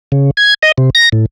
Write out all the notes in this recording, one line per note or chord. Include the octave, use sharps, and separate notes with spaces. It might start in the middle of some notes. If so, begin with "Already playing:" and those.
C#3
G#6
D#5
C3
A#6
A2